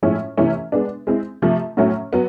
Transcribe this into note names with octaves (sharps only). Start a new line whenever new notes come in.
A2 F3 G#3 C#4 E4
C3 E3 A3 C#4 E4
G#3 B3 D4
G#3 C4 E4
C3 F3 A3
A2 F#3 A3 C#4
F#3 B3